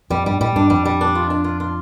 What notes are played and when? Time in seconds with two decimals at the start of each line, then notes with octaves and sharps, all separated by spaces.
0.10 F2 G3
0.26 G2 G3
0.40 A2 G3
0.56 G2 D4
0.70 F2 G3
0.85 G3
1.01 D4
1.15 F4
1.30 D4
1.44 F4
1.60 F4